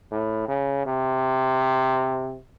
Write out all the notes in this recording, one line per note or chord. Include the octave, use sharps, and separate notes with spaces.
A2
C#3
C3